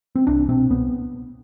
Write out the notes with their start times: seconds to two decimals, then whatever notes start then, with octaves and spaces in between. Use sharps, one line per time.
0.15 C4
0.27 C2 D4
0.48 B2 C4
0.70 C2 B3